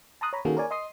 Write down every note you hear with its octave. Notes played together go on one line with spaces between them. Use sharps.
A5 A#5 C6 D#6 F#6
C#5 A#5 B5
D#3 A#3 C#4 F#4 G#4 A4
A#4 C#5 D5 G#5
D#5 C6 D#6 C7